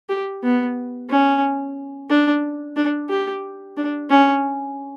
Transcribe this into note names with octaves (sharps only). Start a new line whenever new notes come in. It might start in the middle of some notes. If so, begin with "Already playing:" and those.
G4
B3
C#4
D4
D4
G4
D4
C#4